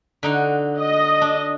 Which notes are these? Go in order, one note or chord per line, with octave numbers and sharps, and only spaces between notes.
D3 D#4 F#4
D#5
D4